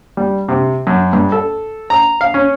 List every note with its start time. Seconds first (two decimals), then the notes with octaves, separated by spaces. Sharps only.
0.17 G3
0.49 C3
0.87 F#2
1.13 G2
1.32 A4
1.90 A#5
2.21 F5
2.34 C#4